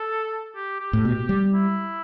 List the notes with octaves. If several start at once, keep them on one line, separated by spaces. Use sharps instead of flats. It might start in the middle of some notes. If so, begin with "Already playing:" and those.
Already playing: A4
G4
G4
A2
B2
G3
E4